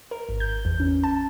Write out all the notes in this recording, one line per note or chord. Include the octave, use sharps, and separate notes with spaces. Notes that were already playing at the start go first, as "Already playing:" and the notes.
A#4
G#1
G6
E2
C#4
A5